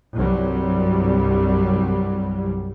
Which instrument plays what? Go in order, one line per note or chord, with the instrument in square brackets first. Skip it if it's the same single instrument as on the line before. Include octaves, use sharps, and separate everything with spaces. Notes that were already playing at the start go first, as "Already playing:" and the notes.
[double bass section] C2 G2 F#3 G3